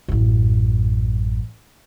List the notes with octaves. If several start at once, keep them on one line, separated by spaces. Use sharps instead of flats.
A1 F#2